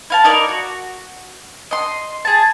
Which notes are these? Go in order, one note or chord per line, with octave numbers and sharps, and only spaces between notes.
E4 F5 A5
D#4 E4 A#4 D5
F#4
D#5 C6
G#4 A5